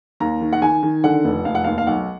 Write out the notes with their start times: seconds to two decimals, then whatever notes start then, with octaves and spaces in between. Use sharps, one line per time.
0.20 D#2 A#5
0.41 D#3
0.53 F#5
0.62 D#3 G#5
0.83 D#3
1.04 D3 F#5
1.25 F1
1.45 F1 F5
1.55 F#5
1.64 D#2 F5
1.78 F5
1.87 B1 F#5